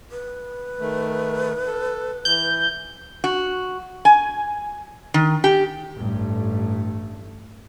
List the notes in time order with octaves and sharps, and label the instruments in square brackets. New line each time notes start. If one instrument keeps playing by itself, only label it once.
[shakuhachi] B4
[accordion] D#3 A3
A4
[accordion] E3 [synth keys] G6
[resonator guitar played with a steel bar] F#4
G#5
D#3
G4
[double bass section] A1 G2 A3